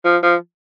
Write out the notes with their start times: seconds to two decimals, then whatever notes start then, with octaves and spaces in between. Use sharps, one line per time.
0.04 F3
0.23 F3